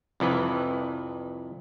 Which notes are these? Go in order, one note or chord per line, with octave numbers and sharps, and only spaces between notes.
C2 F2 E3 B4